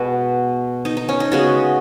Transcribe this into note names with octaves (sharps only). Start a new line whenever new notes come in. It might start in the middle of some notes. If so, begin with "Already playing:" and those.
Already playing: B2 G#3 B3 F#4 B4
D#4
D#4
C#4
D#4
C#3 G#3 B3 F#4